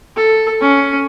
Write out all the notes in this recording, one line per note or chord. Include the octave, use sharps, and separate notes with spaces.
A4
C#4